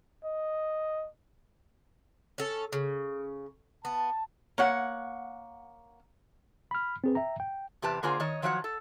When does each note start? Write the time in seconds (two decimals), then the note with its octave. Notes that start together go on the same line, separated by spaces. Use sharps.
0.24 D#5
2.38 C#4 A4
2.73 C#3
3.85 B3 A5
4.58 A#3 C#5 F#5
6.71 B5 F6
7.04 C4 G#4 B4
7.15 E5 G5 A#5
7.40 G5
7.82 E2 C3 G4 B4 A5
8.03 D3 A#3 F4 G#4 C5 G#5
8.20 D#3 C#5 D#5
8.42 D#3 F3 F#3 C#5 F5 F#5
8.64 A4